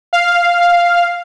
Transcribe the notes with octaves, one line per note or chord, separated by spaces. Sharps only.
F5